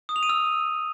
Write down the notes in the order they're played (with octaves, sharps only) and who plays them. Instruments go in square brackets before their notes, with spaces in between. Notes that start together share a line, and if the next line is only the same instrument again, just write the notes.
[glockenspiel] D#6
F7
D#7
E6